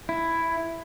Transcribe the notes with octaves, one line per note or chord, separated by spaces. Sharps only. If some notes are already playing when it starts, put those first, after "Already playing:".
E4